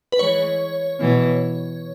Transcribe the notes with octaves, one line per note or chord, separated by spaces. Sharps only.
B4
E3 G#3 C#5
B2 E3